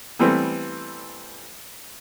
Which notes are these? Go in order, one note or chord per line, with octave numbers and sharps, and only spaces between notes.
E3 G3 A3 B3 C4